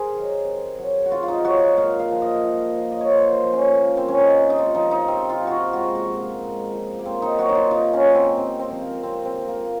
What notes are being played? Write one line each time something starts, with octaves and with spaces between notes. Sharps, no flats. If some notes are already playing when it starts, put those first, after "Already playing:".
Already playing: G#4 A#4 C5
D#3 F#3
C3
F#3
F#4
C3 F4
F4
D#4
F#3 F#4
A#2 F5
F5
F3
D#5
A#2
F3
D#5
C#5
A#2 C5
C5
F3
C#4
A#2 A#3
C4
F3 C#4
D#4
C3
D#4
F4
F3 D#4
D#4
C3 C4
F4
F3
F4 F#4
G#2 F#4
F#4
F3
A#3
G#2
F3
A#3
C3 C4
D#4
F#3 F#4
D#4
F4
C3 D#4
C#4
F#3
C4
C3 C4
C4
F3
A#3
C3 C4
C4
F3
A#3